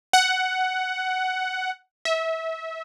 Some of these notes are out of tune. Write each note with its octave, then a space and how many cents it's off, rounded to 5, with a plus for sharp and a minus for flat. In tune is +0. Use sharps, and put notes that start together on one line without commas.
F#5 +10
E5 -25